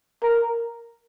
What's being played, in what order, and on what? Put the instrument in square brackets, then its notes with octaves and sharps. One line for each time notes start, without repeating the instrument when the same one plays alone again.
[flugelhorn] A#4